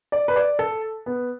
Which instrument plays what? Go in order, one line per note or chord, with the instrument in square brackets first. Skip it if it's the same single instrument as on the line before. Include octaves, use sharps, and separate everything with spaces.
[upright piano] D5
B4
D5
A4
B3